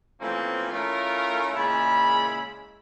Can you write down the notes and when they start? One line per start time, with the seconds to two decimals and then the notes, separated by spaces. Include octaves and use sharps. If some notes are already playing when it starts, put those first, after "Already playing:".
0.21 E3 F3 A3 A#3 C4 C#4
0.71 A3 C#4 E4 F4 A#4
1.56 A#2 C#3 G#3 E4 B5